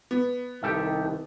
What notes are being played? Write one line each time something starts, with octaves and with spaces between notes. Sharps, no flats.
B3
C2 D#3 G4 A4 E5